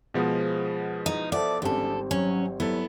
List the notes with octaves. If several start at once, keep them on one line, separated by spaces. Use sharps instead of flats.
B2 F3 G#3 B3 G#4 C5
D#4
A4 C5 D5 E5 F#5
G#1 D3 G3 C4 C#4 A4
F#3 C#4
F#3 B3 E4 A4